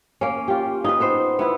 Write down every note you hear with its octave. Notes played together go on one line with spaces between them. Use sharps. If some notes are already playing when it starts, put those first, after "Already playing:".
A#3 C#4
F4 G4
D#4 F4 B4
B3 B4 C5
B3 E4 B4